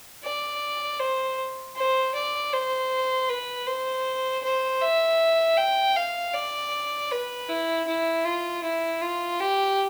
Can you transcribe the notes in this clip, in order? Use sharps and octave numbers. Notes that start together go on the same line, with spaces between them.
D5
C5
C5
D5
C5
B4
C5
C5
E5
G5
F5
D5
B4
E4
E4
F4
E4
F4
G4